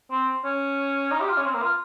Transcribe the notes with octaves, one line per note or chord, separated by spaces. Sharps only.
C4
C#4
D#4
G4
F4
C#4
C4
A#3
F4